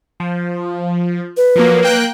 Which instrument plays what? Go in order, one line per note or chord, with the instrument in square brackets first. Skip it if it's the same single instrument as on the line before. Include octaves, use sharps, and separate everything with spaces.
[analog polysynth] F3
[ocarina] B4
[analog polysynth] F3 F#3 A#3
A#3 G5 F#6